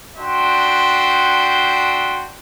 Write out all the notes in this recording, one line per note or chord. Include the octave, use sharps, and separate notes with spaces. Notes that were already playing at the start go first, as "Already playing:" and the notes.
D4 F#4 E5 G5 C6